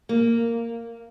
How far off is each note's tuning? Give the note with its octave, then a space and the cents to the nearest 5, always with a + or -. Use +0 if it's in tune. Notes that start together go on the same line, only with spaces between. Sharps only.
A#3 -10